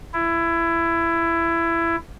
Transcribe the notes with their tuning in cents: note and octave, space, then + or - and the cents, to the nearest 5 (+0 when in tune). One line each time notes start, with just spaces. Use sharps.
E4 +20